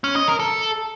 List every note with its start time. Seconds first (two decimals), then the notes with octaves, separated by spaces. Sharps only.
0.04 C#4
0.16 D#5
0.28 A#4
0.39 A4